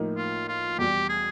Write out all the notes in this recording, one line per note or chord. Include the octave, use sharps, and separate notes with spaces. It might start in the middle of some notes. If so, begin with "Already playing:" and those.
Already playing: A2 F3 A#3 D#4
F4
F4
E2 B2 G3 G4
G#4